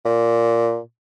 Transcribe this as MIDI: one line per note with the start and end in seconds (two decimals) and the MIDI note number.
0.06 0.80 46